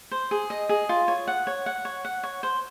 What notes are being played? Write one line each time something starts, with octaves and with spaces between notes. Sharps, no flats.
C5
G#4
D#5
G#4
F4
C#5
F#5
C#5
F#5
C#5
F#5
C#5
C5